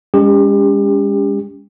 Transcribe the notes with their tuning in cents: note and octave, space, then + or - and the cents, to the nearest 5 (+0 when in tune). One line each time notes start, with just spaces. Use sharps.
G#3 -35 C#4 +30 G4 +30